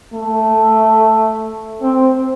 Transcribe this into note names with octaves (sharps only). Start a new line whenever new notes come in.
A3
C4